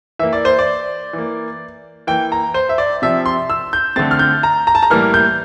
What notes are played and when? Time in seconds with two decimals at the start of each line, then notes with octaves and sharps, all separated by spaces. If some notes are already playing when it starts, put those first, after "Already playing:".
0.19 E3 A#3 E5
0.33 D5
0.45 C5
0.59 D5
1.13 E3
1.18 A#3
2.07 E3 A#3 G5
2.32 A#5
2.54 C5
2.69 E5
2.78 D5
3.02 C3 F3 C4 E5
3.26 C6
3.50 E6
3.73 G6
3.96 D3 A3 C4 A6
4.11 F6
4.19 G6
4.43 A#5
4.67 A#5
4.75 A5
4.83 A#5
4.90 A2 E3 G3 A#3 F6
5.14 G6